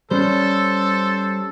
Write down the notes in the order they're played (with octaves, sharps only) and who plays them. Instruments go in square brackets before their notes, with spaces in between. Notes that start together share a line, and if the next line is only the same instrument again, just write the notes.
[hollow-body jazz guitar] G3 C#4 [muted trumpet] A4 [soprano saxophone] C5